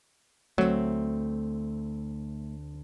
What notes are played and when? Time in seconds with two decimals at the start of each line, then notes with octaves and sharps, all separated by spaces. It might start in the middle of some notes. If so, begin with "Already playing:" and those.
0.58 D2 F#3 A3 C4